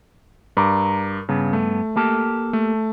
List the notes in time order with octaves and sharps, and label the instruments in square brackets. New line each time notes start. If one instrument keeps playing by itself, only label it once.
[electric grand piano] G2 D6 [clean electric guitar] A#4
[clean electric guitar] G2 B3 [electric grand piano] C#3
[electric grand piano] A3
[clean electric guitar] A#3 G4 A4
[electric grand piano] A3